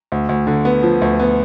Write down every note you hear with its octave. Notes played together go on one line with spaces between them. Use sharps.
D2
D2
D3
B3
F3
D2
B3